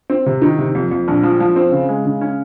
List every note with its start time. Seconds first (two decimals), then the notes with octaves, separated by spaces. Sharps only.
0.10 C4
0.26 C3
0.42 D#3
0.58 C3
0.75 F2
0.91 F2
1.08 A#1
1.23 F3
1.40 F3
1.56 C4
1.72 C#3
1.89 G#3
2.05 C#3
2.21 C#4